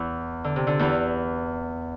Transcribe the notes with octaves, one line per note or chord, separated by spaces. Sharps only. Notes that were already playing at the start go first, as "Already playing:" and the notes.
Already playing: E2 E3
D3
C3
D3
E2 E3